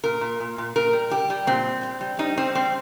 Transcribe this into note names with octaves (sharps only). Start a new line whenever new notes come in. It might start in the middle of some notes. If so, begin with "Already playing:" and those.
A#2 A#4
A#2
A#2
A#2
A#2 A#4
G3
G3 G4
G3
A#2 C4
G3
G3
G3
G3 D#4
G3 C4
G3 C4